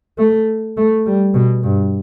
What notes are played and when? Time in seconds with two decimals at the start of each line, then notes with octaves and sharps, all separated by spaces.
0.18 A3
0.77 A3
1.06 G3
1.35 B2
1.63 G2